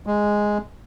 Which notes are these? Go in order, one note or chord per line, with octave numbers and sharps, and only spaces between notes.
G#3